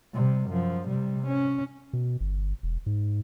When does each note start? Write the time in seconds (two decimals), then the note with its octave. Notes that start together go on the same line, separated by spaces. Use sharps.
0.14 C3 G3
0.50 F#2 F3
0.88 C3 G3
1.26 C#4
1.93 B2
2.20 G1
2.63 E1
2.86 G#2